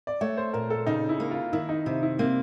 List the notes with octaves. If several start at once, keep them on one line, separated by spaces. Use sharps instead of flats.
D5
A3 C#5
C5
A#2 A#4
A4
C#3 D#4
E4
A#3
F4
D#3 E4
D#4
C3 E4
E4
A#3 C4